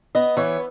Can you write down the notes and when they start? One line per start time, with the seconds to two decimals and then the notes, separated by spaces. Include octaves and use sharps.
0.15 B3 D#5
0.37 E3 C#5